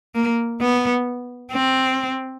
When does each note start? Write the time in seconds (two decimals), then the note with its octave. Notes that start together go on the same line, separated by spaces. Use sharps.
0.15 A#3
0.61 B3
1.53 C4